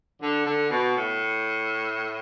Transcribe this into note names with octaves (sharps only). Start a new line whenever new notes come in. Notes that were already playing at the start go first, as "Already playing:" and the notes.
D3
D3
B2
A2